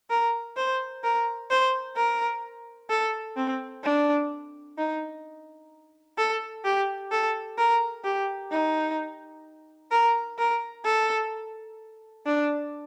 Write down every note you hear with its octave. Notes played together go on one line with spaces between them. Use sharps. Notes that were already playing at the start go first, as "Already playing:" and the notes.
A#4
C5
A#4
C5
A#4
A4
C4
D4
D#4
A4
G4
A4
A#4
G4
D#4
A#4
A#4
A4
D4